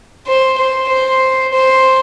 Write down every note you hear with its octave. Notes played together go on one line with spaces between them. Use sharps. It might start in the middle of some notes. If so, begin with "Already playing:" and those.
C5
C5
C5
C5